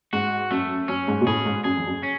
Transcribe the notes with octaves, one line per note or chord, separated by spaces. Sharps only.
G#2 F#4
F#2 A3
F#2 C#4
G#2
B2
A2 G#4
G#2
F#2 G#4
F2
F#2
C#4